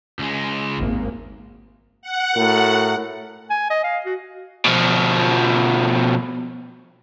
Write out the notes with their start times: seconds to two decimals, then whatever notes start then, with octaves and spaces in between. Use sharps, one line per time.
0.19 C#2 G#3
0.77 G#1 D#2 A#3
2.02 F#5
2.35 A2 F#4 A#4
3.50 G#5
3.70 D#5
3.84 F5
4.06 F#4
4.65 B2 F3